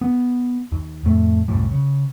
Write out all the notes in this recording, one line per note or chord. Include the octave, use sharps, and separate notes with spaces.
B3
D#2
F2 A2 A3
C2 F#2 A2 G3
C#3